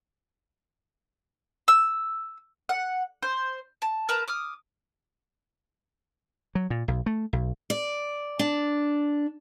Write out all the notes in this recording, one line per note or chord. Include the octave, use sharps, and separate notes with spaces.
E6
F#5
C5
A5
A#4 B4 A5 A#5
D6 D#6 F6
F#3
A#2
B1
A3
B1
D5
D4